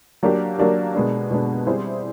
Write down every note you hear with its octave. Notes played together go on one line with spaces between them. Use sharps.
F#3 A#3 D4 G4
F#3 A#3 D4 G4
B2 G#3 B3 D4
B2 G#3 B3 D4
G3 C4 E4 G#4 C5